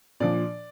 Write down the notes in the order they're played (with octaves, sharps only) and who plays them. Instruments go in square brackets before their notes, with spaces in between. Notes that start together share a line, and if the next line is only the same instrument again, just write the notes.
[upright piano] A#2 F3 D4 D5